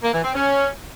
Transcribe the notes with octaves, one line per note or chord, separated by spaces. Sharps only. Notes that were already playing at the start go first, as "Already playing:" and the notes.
A#3
E3
C4
C#4